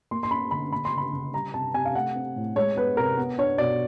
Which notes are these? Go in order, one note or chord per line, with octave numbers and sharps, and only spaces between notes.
A#3 C6
C6
C#4 B5
D3 B5
A#3 B5
C6
C#3
B5
C#3
G3 A#5
C3 A5
C3 G#5
F5
A3 F#5
C4
A2
G#3 C#5
B3 B4
C3 A#4
B3
D4 C#5
B2 D5